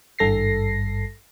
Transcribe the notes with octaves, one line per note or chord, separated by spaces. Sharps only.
G#1 G2 A4 A#6 C7